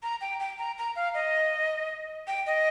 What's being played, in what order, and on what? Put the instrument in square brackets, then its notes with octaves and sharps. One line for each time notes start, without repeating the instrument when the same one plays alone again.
[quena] A#5
G5
G5
A#5
A#5
F5
D#5
G5
D#5